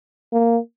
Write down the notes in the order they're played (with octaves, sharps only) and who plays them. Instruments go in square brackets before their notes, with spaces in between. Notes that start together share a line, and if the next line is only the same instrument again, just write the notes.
[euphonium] A#3